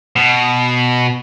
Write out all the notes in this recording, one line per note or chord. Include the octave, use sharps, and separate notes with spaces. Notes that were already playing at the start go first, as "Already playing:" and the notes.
B2